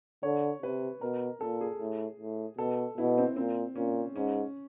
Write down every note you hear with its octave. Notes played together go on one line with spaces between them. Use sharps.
D3 C#5
C3 B4
B2 A#4
A#2 A4
G#4
A2
A2
B2 A4
B2 E4
C4
A#2 C4
A#2 C#4
G#2 C#4